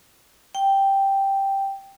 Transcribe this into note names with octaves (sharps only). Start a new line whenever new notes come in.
G5